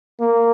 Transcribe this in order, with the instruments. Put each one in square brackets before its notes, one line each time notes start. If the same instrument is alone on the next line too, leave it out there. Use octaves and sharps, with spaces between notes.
[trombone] A#3